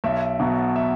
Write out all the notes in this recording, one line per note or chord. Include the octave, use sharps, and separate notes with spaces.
B1 E5
B2 F#3 B3
E5